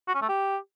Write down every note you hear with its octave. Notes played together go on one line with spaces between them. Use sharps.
F#4
C#4
A3
G4